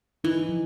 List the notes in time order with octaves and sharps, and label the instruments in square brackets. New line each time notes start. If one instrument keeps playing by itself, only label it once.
[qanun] E3 [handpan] D#4
[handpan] F3